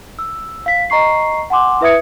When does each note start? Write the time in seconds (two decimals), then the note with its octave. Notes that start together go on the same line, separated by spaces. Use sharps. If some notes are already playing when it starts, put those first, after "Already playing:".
0.19 E6
0.66 F5 B6
0.90 D#5 A#5 C#6 C7
1.50 F#5 G#5 C6 D6
1.81 E4 B4 E5 D#6 G#6 C#7